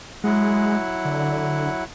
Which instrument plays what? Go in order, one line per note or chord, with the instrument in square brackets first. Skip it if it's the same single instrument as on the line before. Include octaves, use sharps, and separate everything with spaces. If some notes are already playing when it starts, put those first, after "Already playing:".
[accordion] F#3 E4 F#5 [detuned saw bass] G#3
[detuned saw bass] D3